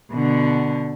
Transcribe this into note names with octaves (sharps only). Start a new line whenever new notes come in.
B2 D3